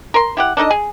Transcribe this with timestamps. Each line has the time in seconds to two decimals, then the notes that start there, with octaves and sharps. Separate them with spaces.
0.14 A#4 C6
0.37 E4 G4 F#5
0.57 D4 D#4 A4 D#5
0.71 G#4